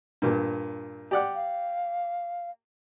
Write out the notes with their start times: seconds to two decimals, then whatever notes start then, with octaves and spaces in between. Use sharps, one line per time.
0.22 G2 A#2
1.11 G4 D5 F#5
1.35 F5